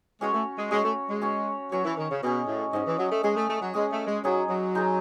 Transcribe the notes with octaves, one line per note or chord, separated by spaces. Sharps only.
G#3 C#4 F#4 C#5
A3
G#3
G#3 C#4 F#4 C#5
A3
G#3
C#4 F#4 C#5
F#3 C#4 F#4 C#5
E3
D#3
C#3
B2 C#4 G#4 D#5
A2
G#2 C#4 G#4 D#5
E3
F#3
A3
G#3 C#4 G#4 D#5
A3
A3
F#3
G#3 C#4 G#4 D#5
A3
G#3
F#3 G#3 D#4 G#4
F#3
G#3 D#4 G#4